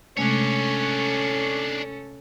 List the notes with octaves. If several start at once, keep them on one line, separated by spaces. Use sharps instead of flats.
C3 G#3 A3 C#4 D4 A4 C#5